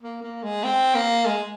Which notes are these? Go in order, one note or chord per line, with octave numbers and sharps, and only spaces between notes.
A#3
A#3
G#3
C4
A#3
G#3